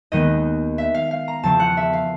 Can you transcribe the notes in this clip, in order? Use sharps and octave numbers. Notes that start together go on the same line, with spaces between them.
D#2 D#3 G#3 B3 D#5
E5
F5
F5
A#5
E2 C#3 F3 A3 C4 A5
F#5
E5
F5